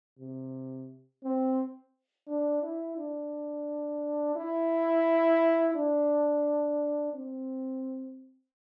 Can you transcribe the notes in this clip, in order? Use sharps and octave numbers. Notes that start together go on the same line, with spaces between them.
C3
C4
D4
E4
D4
E4
D4
C4